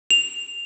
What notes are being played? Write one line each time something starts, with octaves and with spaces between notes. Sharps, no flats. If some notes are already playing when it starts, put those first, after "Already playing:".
F7